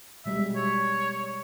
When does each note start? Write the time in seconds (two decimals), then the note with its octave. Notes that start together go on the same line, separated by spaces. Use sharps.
0.26 B2 G3 G#3 E5
0.56 C#5